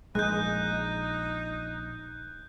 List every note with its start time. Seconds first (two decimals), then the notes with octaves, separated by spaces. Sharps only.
0.15 A#1 G#3 D#4 F#6 G6